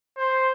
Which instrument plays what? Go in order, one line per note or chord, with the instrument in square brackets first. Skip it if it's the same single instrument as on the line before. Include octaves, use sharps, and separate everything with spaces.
[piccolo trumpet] C5